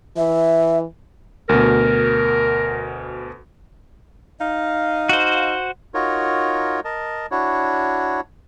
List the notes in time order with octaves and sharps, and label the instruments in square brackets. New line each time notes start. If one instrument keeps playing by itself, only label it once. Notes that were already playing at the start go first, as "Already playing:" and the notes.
[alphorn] E3 [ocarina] E5
[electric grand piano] D2 B2 [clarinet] A#4
[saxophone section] D#4 D#5 F5
[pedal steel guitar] F#4 C5
[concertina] D#4 F4 F#4 A#4 C#5
A#4 D#5 A5
D4 E4 F#4 C#5